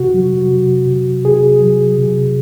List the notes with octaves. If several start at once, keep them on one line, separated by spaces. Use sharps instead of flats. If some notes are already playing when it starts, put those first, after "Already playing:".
Already playing: C3 F#4
F#3
C3
C3
C3 G#4
F#3
C3